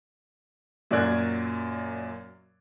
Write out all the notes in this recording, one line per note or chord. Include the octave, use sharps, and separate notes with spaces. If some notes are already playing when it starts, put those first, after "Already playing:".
F#2 A#2 F#3 D5 F#6 G#6